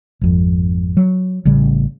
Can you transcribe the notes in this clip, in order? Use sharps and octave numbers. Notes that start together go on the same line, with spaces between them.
G#1 F2
F#3
A1 C#3 G3